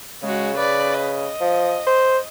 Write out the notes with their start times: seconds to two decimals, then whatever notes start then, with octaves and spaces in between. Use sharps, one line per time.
0.23 C#3 G#3 F#4
0.58 B4 D5
1.01 D#5
1.41 F3
1.87 C5